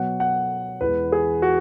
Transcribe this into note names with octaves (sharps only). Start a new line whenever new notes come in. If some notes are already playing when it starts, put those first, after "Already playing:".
Already playing: B2 F#3 F#5
F#5
E2 E3 G#3 B4
G#4
F#4